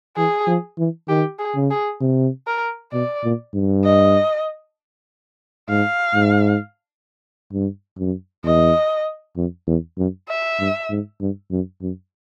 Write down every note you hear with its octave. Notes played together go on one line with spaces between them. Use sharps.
E3 G#4
F3
E3
D#3 G4
G#4
C#3
G#4
C3
A#4
B2 D5
A#2
G2
D#5
G#2 F5
G#2
G2
F#2
E2 D#5
F2
E2
F#2
E5
G2
G#2
G2
F#2
F#2